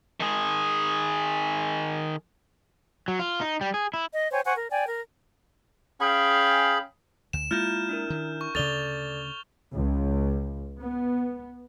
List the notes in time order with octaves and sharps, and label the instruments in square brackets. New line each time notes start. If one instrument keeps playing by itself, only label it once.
[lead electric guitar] D#3 G#4
[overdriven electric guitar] F#3
F4
D#4
G3
G#4
E4
[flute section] D#5
C5 C#5 G5 G#5
C5 F#5 G#5 C#6
A#4
D5 G5 G#5
A#4
[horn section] C#4 F5 G5 [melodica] G#4 B5
[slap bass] D2 [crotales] E7
[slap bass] G#3 A#3 [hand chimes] E4 F4 [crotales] F6 G6 E7
[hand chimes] D4 E4 A#4
[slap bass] D#3
[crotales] C#6
[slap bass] D2 C#3 [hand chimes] A4 D5 [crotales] A6 F7 G7
[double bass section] C#2
B3